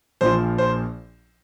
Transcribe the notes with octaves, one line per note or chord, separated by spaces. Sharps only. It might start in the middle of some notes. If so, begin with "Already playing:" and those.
A#1 A#2 F3 C5
C5